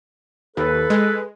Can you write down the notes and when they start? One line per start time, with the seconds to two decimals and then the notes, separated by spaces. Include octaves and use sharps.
0.57 D#2 A4 B4
0.90 G#3